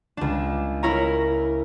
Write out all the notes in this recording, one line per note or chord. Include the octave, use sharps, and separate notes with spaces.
C#2 D4
E4 A#4 C#5 A#5